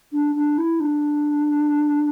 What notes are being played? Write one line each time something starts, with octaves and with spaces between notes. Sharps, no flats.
D4
D4
E4
D4